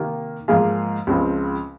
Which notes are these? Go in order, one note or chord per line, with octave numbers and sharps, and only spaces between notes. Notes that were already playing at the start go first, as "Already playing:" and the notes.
Already playing: C3 D#3 A#3
G#2 F3 A#3 F4 G#4
C#2 C#3 F3 C4